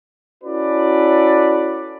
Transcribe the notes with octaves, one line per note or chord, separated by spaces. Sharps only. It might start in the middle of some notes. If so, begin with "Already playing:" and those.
C#4 E4 F#4 A4 B4 D5